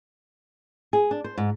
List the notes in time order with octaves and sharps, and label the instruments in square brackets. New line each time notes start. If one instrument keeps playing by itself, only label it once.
[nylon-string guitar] G#4
D4
C5
G#2